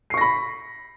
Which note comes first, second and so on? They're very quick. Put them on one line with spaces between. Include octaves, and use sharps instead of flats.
C7 C#6 A#6 B5